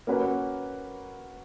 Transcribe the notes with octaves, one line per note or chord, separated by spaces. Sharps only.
A#3 C#4 F#4 B4